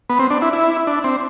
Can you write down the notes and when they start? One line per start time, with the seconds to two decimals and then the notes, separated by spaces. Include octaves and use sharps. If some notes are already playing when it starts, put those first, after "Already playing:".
0.10 B3
0.19 C4
0.30 D4
0.42 E4
0.53 E4
0.87 D4
1.04 C4